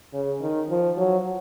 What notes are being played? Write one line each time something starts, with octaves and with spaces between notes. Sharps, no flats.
C#3
D#3
F3
F#3